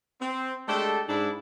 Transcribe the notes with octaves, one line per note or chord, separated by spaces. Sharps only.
C4
G#3 A3 D4 G4 A4
G#2 D4 E4